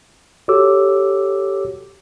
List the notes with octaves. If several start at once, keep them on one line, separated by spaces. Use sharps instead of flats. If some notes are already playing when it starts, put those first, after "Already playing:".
F#4 G4 A4 C#5 D6 E6